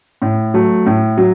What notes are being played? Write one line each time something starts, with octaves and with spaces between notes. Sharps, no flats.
A2
F#3 A3
A2
F#3